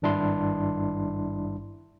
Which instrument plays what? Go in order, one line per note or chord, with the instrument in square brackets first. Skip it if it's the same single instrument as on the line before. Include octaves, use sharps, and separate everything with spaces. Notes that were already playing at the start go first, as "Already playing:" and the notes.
[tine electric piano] G#1 G2 D4 E4 C6